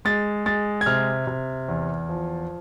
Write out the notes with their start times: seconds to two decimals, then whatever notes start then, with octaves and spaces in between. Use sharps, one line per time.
0.05 G#3 A6
0.46 G#3 A6
0.81 G#6
0.86 C3 F6
1.27 C3
1.68 E2
2.09 F3